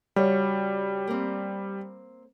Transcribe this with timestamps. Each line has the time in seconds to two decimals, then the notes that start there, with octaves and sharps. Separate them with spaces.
0.16 C#3 G3 F#4 C#5
1.07 A#3 C4